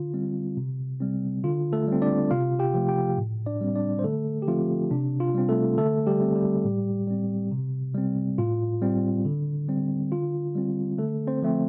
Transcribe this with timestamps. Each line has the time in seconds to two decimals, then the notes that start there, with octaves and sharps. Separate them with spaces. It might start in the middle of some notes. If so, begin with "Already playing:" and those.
Already playing: D3 F4
0.14 G3 C4
0.57 C3
1.01 G3 C4
1.44 D3 F4
1.73 A3 A4
1.87 G3 C4
2.02 D4 D5
2.31 C3 F4 F5
2.59 G4 G5
2.74 F3 A3
2.89 G4 G5
3.18 A2
3.46 D4 D5
3.61 G3 C4
3.75 D4 D5
3.99 C5
4.04 D3 A3 A4
4.42 G4
4.47 F3 A3 C4 F4
4.91 C3 D4
5.20 F4
5.34 G3 C4
5.49 A3 A4
5.77 D3 A3 A4
6.07 G3 G4
6.21 A3 C4
6.35 G3 G4
6.64 A2
7.07 G3 C4
7.51 C3
7.95 G3 C4
8.38 A2 F4
8.82 G3 C4
9.25 D3
9.69 G3 C4
10.12 D3 F4
10.55 G3 C4
10.98 D3 A3 A4
11.27 C4 C5
11.42 F3 A3 C4